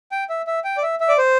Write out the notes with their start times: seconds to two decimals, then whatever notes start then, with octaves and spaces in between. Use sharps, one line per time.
0.12 G5
0.29 E5
0.47 E5
0.64 G5
0.77 D5
0.83 E5
1.00 E5
1.08 D5
1.18 C5